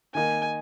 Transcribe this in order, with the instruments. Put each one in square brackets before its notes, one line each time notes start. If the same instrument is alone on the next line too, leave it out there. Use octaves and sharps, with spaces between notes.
[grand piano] D#3 A#3 D#4 [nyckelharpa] G#5